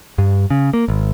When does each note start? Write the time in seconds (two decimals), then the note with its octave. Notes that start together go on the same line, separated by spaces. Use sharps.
0.18 G2
0.50 C#3
0.73 A#3
0.88 G#1